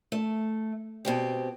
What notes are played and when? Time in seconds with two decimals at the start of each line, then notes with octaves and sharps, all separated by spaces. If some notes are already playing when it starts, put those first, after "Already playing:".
0.12 A3
1.05 B2 C4 G4